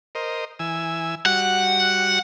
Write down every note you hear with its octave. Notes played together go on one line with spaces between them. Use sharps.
A#4 C5 D#5
E3 G#5 E6
G3 F#4 F#5